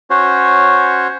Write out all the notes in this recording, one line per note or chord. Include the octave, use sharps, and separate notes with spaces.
C#4 F#4 C5 C#5